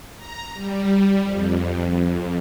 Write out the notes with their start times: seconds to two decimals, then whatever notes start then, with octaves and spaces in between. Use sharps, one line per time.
0.17 A#5
0.54 G3
1.24 F2
1.83 F2